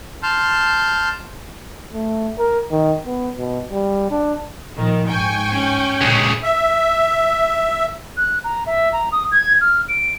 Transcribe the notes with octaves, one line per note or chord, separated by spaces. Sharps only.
A5 C6 F6 G6
A3
A#4
D#3
B3
B2
G3
D4
A#2 D#3 F3
G#2 G5 G#5 C#6
C#4
D2 A#2 C#3 G#3
E5
F#6
A#5
E5
A#5
D#6
G#6
F6
D7